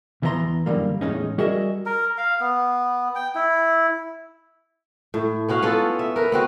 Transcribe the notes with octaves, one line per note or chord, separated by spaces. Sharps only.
E2 E3 B3 C5 A#5 C6
F#2 D3 G3 A#3
E2 A2 G#3 C#4 D#4
G3 F#4 G#4 A#4 D#5 E5
A#4
F5
B3
G5
E4
A2
B3 C#4 F#4 F5
B3 C#4 F4 A4
E5
A#4 B4
B3 C4 F#4